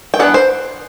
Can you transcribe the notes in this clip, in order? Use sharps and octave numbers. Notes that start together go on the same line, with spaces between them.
G5
E3 G3 B3 D4 F#5
C5